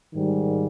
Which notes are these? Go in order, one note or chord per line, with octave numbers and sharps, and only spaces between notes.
G#2 D#3 G3